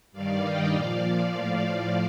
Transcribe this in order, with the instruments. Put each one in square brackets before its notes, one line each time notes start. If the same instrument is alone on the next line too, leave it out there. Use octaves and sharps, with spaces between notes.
[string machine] G2 D#3 G3 D5 F5
D#5 G5
A#2 F3 D5 F5
D5 F5
A2 F3 D5 F5
D5 F5